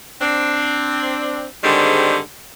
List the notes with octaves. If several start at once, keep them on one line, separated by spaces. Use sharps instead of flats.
C4 D4
G#2 D3 D#3 G3 G#3 C4